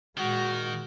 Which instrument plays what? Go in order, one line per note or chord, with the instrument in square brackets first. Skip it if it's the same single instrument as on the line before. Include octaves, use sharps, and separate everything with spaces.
[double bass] A#2 G#3 [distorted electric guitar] D#3 [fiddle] F#4